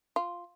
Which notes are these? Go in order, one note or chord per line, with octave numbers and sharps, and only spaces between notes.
F4